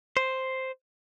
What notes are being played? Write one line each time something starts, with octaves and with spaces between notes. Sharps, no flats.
C5